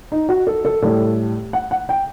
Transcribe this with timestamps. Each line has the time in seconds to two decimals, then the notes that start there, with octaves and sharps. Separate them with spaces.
0.12 D#4
0.29 F#4
0.47 A4
0.65 A4
0.82 A2 G3 A4
1.53 F#5
1.71 F#5
1.89 G5